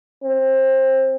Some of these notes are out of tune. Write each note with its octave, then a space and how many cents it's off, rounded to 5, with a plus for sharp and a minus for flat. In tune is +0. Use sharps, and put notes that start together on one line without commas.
C4 +20